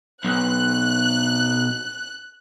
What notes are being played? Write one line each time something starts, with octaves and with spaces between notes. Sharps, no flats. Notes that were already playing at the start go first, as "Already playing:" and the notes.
B1 F#6